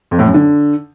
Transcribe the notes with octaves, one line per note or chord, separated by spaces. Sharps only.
F2
A2
F#2
D3